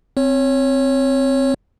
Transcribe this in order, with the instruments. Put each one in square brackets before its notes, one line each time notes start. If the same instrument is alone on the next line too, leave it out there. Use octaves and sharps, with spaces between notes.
[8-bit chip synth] C4 C#5